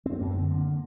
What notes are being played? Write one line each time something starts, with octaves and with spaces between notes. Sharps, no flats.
F#2 C4
F#2 A#3
D3 C4
D3 A#3